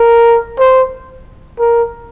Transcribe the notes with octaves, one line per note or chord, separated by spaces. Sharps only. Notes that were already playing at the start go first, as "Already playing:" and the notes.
Already playing: A#4
C5
A#4